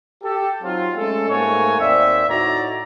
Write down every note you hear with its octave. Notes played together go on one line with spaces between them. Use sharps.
G4 A4
F#3 C4 D#4 F4
G#3 A3 C#4 A4
G#2 A3 A#3 F#4 C#5 G#5
D#2 C4 D5 E5
A2 D#4 F#4 C#5 D5 A#5